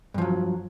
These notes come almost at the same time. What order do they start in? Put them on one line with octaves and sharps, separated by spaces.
G2 F3 F#3